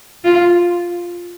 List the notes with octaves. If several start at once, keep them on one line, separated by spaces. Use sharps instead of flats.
F4